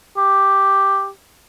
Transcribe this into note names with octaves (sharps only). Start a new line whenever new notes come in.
G4